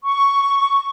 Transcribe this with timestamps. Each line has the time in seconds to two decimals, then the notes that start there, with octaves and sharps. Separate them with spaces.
0.03 C#6